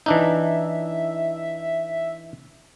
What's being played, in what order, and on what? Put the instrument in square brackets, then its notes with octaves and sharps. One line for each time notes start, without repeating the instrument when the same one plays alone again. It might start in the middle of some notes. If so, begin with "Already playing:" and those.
[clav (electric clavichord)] E3 D4 D#4 [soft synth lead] E5